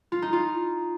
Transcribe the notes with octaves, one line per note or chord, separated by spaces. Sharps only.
F4
D#4
F4